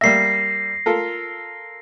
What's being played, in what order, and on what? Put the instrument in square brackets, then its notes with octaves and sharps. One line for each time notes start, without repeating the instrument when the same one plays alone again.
[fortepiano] G3 A#3 E5 [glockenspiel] A#6 C7
[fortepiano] F4 A4 A#4